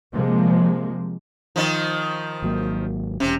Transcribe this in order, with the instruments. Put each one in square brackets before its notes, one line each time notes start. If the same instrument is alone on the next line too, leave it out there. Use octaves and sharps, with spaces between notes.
[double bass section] C3 F3 G#3 A#3
[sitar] D#3 F3
[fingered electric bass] G#1 F#3 A#3
[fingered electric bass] E1 C#4 [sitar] C3